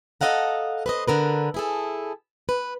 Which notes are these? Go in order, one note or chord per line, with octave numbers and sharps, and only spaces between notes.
A4 A#4 D#5 F5 F#5 A#5
B4 C5 D#5
D3 A#4 B4
E4 G#4 A4
B4